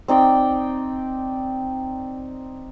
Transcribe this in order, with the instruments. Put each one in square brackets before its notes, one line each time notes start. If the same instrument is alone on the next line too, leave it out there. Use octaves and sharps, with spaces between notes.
[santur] C4 D#4 D5 G5